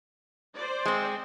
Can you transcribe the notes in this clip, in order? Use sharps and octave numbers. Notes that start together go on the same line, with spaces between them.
C5 D5
G#3 C4